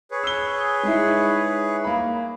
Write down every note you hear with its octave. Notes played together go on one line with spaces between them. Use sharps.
G#4 B4 C#5
E6 G7
G#3 D#4 E4
A#3 B5